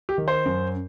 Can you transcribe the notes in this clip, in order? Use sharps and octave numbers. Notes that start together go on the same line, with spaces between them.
G4
D#3
C5
F#2